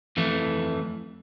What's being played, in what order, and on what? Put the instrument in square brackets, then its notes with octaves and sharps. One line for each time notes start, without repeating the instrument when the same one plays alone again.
[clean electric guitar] F2 E3 A3